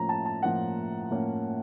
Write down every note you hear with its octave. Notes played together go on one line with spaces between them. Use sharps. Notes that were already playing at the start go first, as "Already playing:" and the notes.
Already playing: A2 F3 A#3 C#4 A#5
A5
A5
A2 F3 A#3 C#4 F#5
A2 F3 A#3 C#4